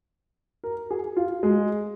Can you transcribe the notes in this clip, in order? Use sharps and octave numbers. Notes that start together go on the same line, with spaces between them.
A#4
G#4
F4
G#3